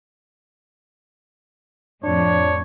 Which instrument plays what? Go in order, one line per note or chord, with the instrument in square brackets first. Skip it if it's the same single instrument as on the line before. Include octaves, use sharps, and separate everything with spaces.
[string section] F2 A2 [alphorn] D4 [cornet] C#5